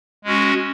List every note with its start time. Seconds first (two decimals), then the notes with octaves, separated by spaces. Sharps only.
0.24 G#3 C#4 F#4